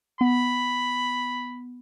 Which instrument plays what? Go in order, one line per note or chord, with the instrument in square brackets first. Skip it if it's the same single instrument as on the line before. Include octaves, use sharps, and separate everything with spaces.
[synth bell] B3 [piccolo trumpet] B5